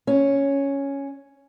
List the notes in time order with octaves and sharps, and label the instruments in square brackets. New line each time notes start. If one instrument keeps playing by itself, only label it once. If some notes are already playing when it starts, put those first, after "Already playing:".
[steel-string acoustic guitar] C#4